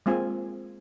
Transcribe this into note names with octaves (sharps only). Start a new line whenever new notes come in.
G#3 A#3 C4 F4 G#5